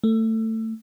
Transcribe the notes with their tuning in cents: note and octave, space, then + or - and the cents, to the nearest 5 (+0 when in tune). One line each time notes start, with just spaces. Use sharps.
A3 +20